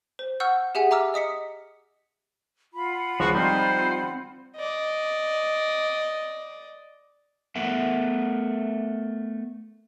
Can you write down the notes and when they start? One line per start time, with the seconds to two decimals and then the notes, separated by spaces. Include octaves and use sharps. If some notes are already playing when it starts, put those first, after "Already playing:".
0.19 C5
0.40 F#5 C#6 E6 F6 G6
0.75 G4 G#4 E5 F#5 G#5
0.91 E5 A#5 D6 E6 F6
1.14 D#5 D#6 B6 C#7
2.74 F4 F#5 B5
3.20 C#2 F3 F#4
3.35 F3 G3 C4 D#4 C5
4.57 D5 D#5
7.55 A3 B3 A#4 E5 F#5